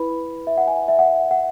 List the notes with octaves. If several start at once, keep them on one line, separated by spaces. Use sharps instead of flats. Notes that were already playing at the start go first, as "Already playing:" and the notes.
Already playing: E4 B4 B5
E5
F#5
G#5
E5
F#5
F#5